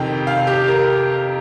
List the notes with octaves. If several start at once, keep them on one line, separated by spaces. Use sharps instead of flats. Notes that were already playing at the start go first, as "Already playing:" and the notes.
Already playing: F2 C3 D#3 G5
F5
G4
A#4